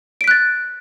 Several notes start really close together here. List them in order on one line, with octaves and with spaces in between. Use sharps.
D7 B6 F#6 A6